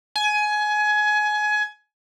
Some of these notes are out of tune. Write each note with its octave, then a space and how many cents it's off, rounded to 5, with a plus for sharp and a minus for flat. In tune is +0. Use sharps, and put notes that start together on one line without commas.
G#5 +20